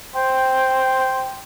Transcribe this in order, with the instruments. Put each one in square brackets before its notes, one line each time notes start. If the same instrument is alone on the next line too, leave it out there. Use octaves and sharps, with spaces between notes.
[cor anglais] C5 [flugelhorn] G5